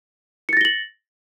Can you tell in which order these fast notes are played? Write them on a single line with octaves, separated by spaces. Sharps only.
C#7 A6 A#6 G7 F#7